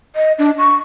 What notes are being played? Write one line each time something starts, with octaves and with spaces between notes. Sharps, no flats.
D#5
D4
C#6